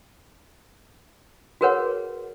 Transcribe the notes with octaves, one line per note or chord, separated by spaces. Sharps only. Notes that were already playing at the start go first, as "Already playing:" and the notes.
F#4 G#4 A#4 B4 C#5 F#5